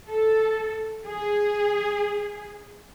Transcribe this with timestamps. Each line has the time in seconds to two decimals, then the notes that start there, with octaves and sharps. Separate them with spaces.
0.11 A4
1.06 G#4